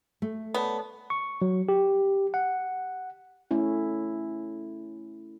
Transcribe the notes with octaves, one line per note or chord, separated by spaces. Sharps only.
A3
B3 C#5 D5 A5
C#6
F#3
G4
F#5
A3 C#4 E4